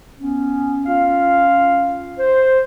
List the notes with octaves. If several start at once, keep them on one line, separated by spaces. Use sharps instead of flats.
B3 C#4
C#4 F4 F5
C5